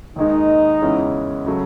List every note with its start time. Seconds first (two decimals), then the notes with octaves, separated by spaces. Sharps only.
0.16 D#2 D#3 G#3 D#4
0.82 E2 C#3 E3 G#3 C#4
1.46 C#3 F#3 A3